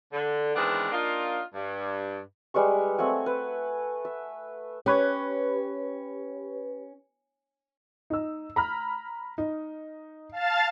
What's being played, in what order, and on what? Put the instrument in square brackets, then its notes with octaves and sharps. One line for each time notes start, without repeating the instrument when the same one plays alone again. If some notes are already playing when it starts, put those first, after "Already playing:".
[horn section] D3
D#3 E3 G#3 B3 C4 D4
A#3 D4 D#4 F4
G2
[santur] G3 G#3 B4 C#6
A3 C4 F#5 G#5
B4
E5
[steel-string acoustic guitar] C#4 [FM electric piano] G4 B4 C#5
[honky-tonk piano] D#4 E6
A#5 B5 F6
D#4
[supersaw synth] F5 A5 A6